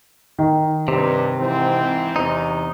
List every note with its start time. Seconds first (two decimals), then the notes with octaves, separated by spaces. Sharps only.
0.38 D#3
0.88 G2 C3
1.39 G#2 E3 C4
2.16 E2 C3 D#4